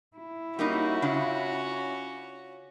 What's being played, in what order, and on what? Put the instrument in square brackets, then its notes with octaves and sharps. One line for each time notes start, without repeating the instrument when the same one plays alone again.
[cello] E4
[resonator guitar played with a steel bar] G3 A#3 D#4 [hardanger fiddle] C#4 F#4
[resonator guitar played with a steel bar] C#3 D4 F4